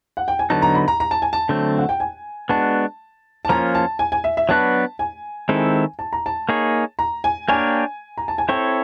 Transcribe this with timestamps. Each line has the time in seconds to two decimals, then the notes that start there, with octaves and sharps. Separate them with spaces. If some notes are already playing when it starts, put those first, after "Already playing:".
0.17 F#5
0.28 G5
0.39 G#5
0.50 D3 F#3 B3 D#4 A5
0.62 A#5
0.75 B5
0.88 A#5
1.00 A#5
1.11 A5
1.22 G#5
1.33 A5
1.49 D3 F#3 A3 C4
1.78 F#5
1.89 G5
2.00 G#5
2.49 G#3 B3 D4 F#4 A5
3.45 A5
3.49 F3 A#3 C#4 F4 A#5
3.75 A5
3.99 G#5
4.12 G#5
4.24 E5
4.37 E5
4.49 F#3 B3 D4 F#4 B4 A5
4.99 G#5
5.49 D#3 G#3 C4 E4 A4
5.99 A5
6.13 A#5
6.26 A5
6.49 A#3 D#4 G#4 C#5
6.99 A#5
7.24 G#5
7.48 A#3 D4 G4 A#4 C#5 G#5
8.18 A#5
8.28 A5
8.38 G#5
8.48 C4 E4 A4 C#5 G5